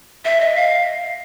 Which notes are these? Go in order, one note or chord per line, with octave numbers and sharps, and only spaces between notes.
E5
D#5
F5